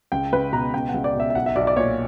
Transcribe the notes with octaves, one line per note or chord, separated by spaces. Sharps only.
C#2 G5
C#2 B4
B2 A#5
C#2 G5
C#2 F#5
D5
B2 E5
E5
B1 F#5
E5
B1 D5
D5
A#2 C#5